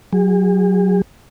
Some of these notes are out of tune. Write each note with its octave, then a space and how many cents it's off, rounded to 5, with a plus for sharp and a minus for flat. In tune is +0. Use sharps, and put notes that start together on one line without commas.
F#3 +0 G#4 -40